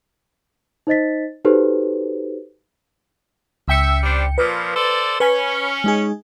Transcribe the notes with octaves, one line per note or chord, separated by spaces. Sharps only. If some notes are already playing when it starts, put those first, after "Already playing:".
D#4 C5 D#5 A6 B6
D#4 F#4 G4 A4 B4 C5
C#2 E5 G5 C#7
G3 D4 C5
A#2 F3 B4
A4 C5 D5
C#4 B4 G#5 B5
G#3 D#4 G#4